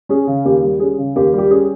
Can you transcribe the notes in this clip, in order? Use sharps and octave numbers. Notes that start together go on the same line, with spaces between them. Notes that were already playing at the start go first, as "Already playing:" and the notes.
C#4 G#4
C#3
D#2 G4
G3
C#4 G#4
C#3
D#2 G4
G3 G4
C#4 G#4